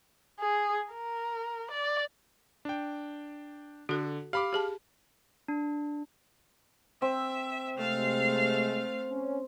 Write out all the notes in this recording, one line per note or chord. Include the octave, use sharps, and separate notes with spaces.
G#4
A#4
D5
D4 G5
D3 F#4 A4
G4 F5 B5 D6
G4 G#4 A5
D4
C4 E5
C3 G#3 A3 F5
C#4